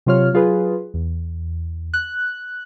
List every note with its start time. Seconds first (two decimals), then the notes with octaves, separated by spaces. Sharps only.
0.06 C3 F#3 F4 C#5 F6
0.34 F#3 F4 G#4 B4
0.94 E2
1.94 F#6